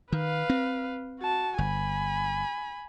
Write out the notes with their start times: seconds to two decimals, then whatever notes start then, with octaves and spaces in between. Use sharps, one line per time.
0.12 D#3 B4 F5
0.50 C4
1.20 F#4 A5
1.58 G1 G#5 B5